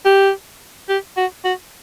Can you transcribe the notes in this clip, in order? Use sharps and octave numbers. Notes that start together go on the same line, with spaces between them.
G4
G4
F#4
F#4